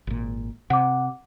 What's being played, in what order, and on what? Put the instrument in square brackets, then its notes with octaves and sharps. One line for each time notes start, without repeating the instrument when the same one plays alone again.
[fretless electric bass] G#1 A#2
[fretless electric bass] C3 [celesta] F#5 D6